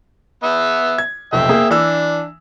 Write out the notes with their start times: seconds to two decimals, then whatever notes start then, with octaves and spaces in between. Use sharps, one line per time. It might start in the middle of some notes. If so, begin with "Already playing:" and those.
0.43 B3 E5
0.98 G#6
1.33 F1 B1 E5 G5
1.49 A#3 G#4
1.70 E3 D4 E6